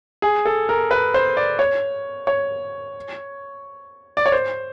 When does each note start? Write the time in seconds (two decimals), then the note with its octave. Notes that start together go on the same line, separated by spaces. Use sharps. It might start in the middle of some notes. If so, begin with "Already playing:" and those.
0.22 G#4
0.45 A4
0.69 A#4
0.91 B4
1.14 C5
1.37 D5
1.59 C#5
2.27 C#5
4.17 D5
4.26 C#5
4.32 C5